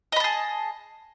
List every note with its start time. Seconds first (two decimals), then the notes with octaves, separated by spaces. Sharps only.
0.12 D#5
0.16 B5
0.20 A5
0.24 G#4